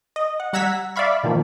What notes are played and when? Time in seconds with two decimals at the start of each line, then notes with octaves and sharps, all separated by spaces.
0.16 D#5
0.40 F#5
0.53 G3 F#5 A#5 E6 G#6 B6
0.96 D5 E5 F5 B5 C#6
1.23 B2 D#3 F3 A#3